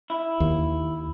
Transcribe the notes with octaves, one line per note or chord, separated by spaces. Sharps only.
E4
D#2